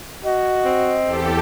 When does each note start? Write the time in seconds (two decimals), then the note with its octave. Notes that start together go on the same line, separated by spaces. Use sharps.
0.24 F#4 D#5
0.65 C4
1.03 E2 G4 A4